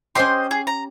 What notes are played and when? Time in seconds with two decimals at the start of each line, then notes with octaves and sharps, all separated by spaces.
0.15 C#4 G4 C5 D#5 C6
0.51 G#4
0.67 A#5